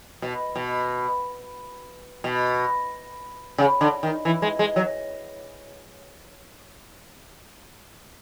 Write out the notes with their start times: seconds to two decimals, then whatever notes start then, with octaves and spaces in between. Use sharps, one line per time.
0.22 B2
0.55 B2
2.24 B2
3.58 C#3
3.81 D3
4.03 D#3
4.25 E3
4.42 G#3
4.59 G#3
4.76 F#3